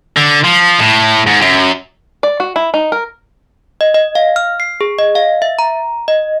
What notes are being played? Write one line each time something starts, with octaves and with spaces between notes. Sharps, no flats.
D3
F3
A2
G#2
F#2
D5
F#4
E4
D#4
A#4
D#5
D#5
F5
F6
C7
G#4
D#5
F5
E5
A#5
D#5